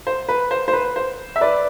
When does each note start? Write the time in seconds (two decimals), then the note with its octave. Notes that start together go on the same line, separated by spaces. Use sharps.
0.07 C5
0.29 B4
0.51 C5
0.68 C5
0.73 B4
0.96 C5
1.36 E5
1.41 B4 D5